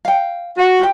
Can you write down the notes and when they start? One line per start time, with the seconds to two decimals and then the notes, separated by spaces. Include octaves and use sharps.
0.05 F5 G5
0.57 F#4
0.79 F4 G4 G5